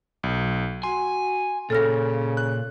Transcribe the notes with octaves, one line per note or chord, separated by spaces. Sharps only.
B1
F#4 G#5 C6
A#2 C#3 A4 F6 A#6
F#6